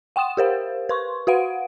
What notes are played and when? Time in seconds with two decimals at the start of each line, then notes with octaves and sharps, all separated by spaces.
0.16 F#5 G5 C6 D#6 E7
0.37 G4 A#4 C5 F5
0.89 B4 C6 C#6
1.27 F#4 B4 F5 F#5 D7